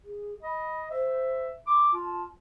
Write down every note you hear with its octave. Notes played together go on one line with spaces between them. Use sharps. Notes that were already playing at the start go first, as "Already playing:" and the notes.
G#4
D#5 B5
C5 E5
C6 D6
F4 A5